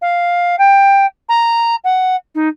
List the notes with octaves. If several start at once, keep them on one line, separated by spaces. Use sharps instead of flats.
F5
G5
A#5
F#5
D#4